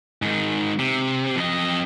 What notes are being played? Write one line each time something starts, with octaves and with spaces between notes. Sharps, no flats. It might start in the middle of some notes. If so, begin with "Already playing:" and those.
G#2 D#3
C3
F2 D#5